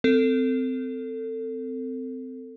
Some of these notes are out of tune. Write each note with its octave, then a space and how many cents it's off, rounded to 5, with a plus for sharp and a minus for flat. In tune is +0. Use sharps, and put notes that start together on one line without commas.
C4 -25 A4 +25